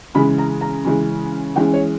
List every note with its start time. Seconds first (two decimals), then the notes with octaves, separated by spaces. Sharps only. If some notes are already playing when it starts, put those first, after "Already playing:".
0.14 C#3 E3 G#3 C#4 B5
0.38 A#5
0.61 A#5
0.85 C#3 E3 G#3 C#4
1.56 E3 G#3 C#4 G5
1.74 C#5